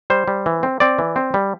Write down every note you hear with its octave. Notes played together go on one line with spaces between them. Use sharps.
G3 C5
G3
E3
C4
C4 D5
E3
C4
G3